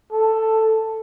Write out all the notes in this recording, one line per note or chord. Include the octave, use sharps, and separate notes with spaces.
A4